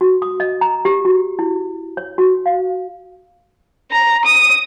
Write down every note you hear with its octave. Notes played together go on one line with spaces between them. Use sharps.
F#4
D#6
D#5
A#5
G4
F#4
E4
C#5
F#4
F5
A#5
D#6